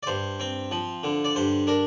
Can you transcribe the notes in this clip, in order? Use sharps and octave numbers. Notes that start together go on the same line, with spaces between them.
D5
G2 C5
C4
F3
D3
D5
G2 C5
D4 A#4